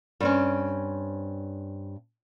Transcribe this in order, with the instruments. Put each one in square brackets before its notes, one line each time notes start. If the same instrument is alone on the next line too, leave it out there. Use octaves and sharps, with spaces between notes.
[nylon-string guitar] G2 C4 C#4